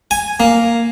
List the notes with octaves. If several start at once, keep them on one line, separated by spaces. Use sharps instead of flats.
G#5
A#3